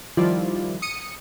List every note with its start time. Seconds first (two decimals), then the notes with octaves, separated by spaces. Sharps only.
0.17 D#3 F3 G3 E4 F4 D5
0.82 D#6 C#7 D#7